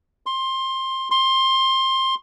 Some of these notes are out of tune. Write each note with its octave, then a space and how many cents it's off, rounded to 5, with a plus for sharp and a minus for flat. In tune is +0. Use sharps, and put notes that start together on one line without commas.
C6 +20
C6 +20